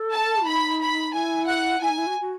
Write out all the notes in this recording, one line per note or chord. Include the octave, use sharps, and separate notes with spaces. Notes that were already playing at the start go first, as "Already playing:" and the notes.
Already playing: A4
A5
D#4 B5
B5
E4 G#5
F#5
E4 G#5
D#4
E4
F#4
F#4